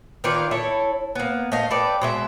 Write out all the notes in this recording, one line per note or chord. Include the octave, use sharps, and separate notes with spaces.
D#3 E3 F4 D5
E4 A4 C#5
A#3 B3
A3 D#5 F5
A4 B4 D5 G5
B2 G#3 E5